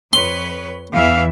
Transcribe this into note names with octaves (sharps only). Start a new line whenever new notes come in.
F2 B4 C#5 C6
E2 E3 E5 F5